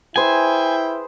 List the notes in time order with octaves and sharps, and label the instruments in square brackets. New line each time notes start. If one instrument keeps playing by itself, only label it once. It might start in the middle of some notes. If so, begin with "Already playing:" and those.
[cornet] E4 [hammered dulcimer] G#4 B4 C5 [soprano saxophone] G5 [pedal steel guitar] G#5